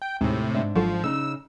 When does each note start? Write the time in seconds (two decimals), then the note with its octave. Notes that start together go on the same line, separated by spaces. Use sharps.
0.02 G5
0.21 D#2 A2 C3 G#3
0.55 G#2 D4 E5
0.75 G#1 F3 F#3 A4
1.04 C#3 D#4 E6